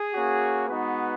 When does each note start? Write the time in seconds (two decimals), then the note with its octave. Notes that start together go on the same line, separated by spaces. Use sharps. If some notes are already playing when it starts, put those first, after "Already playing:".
Already playing: G#4
0.13 A#3 C#4 F#4
0.69 G#3 B3 D#4 F#4 B4